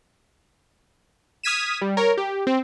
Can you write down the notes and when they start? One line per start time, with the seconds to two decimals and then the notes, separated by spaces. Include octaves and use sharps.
1.44 D#6 F6 G#6 B6 D#7 E7
1.81 G3
1.97 A#4 C#5
2.17 G4
2.47 C4